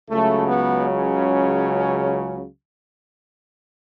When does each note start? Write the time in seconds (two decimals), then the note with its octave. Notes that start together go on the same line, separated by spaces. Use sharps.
0.10 C#2 C#3 F#3 A3
0.47 B3
0.84 C#4